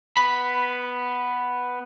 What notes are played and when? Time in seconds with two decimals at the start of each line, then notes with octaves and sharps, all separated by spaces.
0.17 B3 B5